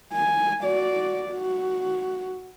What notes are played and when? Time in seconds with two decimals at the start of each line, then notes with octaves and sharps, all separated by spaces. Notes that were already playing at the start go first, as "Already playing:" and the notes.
0.13 G#5
0.62 F#4 D5
1.31 F#4